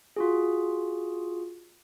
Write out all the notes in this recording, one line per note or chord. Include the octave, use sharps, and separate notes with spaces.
F4 F#4 G#4